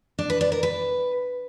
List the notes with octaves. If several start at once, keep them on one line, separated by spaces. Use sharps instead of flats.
D4
B4
D5
A#4
B4